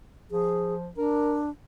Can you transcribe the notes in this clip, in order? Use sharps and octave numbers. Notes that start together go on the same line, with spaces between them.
F3 G#4
D4 A#4